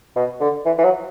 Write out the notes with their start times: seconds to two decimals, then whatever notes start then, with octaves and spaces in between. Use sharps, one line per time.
0.16 B2
0.41 D3
0.66 E3
0.78 E3
0.84 F#3